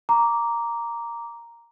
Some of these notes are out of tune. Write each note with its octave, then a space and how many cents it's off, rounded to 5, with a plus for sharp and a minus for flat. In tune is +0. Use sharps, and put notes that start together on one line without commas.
A#5 +0 D6 -10